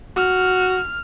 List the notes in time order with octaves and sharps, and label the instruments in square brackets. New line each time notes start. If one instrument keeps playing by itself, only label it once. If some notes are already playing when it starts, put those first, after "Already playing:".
[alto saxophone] F#4 [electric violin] F6